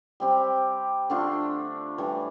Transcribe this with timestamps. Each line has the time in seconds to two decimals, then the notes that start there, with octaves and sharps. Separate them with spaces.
0.20 G3 C4 G4
1.10 D3 A3 D4 F4
1.98 A2 E3 G3